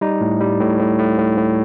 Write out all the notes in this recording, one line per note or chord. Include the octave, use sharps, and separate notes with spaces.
G3 D#4
A2
G3
A2
A2
A2
A2
A2